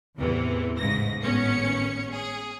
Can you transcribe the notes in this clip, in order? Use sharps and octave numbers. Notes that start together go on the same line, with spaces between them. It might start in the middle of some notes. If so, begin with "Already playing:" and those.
E2 A2 C3 E3
A1 G#2 C#3 A#6
G#1 A2 B3 C#4 C#5 C#7
G#4